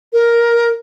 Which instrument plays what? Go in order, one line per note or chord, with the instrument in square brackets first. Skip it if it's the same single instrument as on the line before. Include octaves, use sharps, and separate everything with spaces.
[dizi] A#4